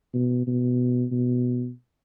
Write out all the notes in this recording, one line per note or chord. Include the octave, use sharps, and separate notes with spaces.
B2
B2
B2